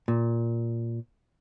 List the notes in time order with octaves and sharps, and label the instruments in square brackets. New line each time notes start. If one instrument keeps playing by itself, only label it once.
[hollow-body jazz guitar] A#2